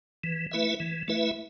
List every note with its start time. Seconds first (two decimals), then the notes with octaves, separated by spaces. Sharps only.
0.24 E3
0.52 A3 E4 B4 E5
0.80 E3
1.08 A3 E4 B4 E5